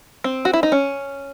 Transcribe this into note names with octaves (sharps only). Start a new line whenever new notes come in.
C4
F#4
E4
D#4
C#4